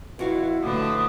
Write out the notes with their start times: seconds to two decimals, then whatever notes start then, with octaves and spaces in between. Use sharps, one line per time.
0.19 F2 E4 F#4 B4 F5 F#5
0.62 A2 D3 B4 D6 D#6